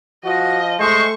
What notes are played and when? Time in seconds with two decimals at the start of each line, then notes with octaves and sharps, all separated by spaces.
0.25 F3 F#4 D#5
0.80 G#3 A3 C5 C#6